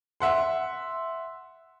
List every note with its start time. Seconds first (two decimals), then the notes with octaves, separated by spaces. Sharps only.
0.20 E5 F#5 C6